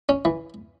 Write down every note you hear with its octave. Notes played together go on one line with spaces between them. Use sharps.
C#4
E3